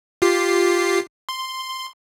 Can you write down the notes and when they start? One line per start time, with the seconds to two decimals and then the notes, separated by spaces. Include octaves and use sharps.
0.22 F4 G4 C7
1.29 C6